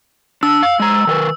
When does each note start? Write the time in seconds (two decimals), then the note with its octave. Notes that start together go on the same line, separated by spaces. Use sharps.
0.43 D4 E6
0.63 F5
0.80 G#3 A#5
1.07 D#3 A#4 B4